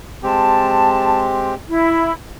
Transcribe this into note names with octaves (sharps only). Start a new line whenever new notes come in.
G#3 C4 G4 A5
E4